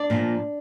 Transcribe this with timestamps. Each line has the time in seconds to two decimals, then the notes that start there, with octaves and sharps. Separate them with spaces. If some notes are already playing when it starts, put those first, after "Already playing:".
Already playing: D4 D5
0.10 A#2 F3 A#3